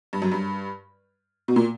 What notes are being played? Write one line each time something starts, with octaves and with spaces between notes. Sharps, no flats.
G2
F#2
G2
B2
A#2